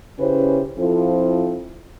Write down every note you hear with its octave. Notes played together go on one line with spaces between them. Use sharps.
C#3 C#4 E4 G4 B4 C5
F3 C4 E4 F4 A4